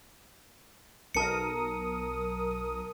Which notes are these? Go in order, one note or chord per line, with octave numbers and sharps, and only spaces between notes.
B1 A#4 A5 D#6 C#7